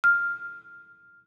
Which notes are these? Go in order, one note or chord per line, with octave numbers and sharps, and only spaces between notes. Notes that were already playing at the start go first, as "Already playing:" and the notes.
F6